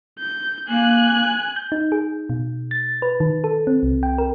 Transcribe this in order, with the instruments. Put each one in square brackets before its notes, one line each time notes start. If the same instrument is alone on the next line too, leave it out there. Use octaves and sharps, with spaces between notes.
[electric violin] G6
[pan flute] A#3 [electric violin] G#5 F#6
[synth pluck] G6
D#4
G#4
B2
A6
B4
D#3
A4
C4
C2
G5
A#4